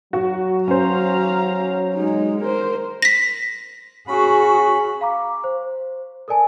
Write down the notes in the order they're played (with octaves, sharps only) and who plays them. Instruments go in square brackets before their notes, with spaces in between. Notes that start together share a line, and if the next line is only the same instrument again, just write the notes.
[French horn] F#3 [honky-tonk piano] F#4
[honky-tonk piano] C#4 C5 [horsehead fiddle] F5 A#5
[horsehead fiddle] G#3 D#4
A#4 C5
[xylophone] A#6 B6
[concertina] C#4 B5 [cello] F#4 G#4
[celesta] F5 A#5 D6
C5
A4 A#4 D5 G#5 A5